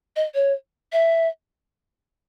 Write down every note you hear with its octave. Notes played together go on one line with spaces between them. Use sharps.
D#5
C#5
E5